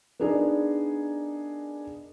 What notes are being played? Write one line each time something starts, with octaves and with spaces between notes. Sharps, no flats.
B3 D4 D#4 G#4 A#4 D5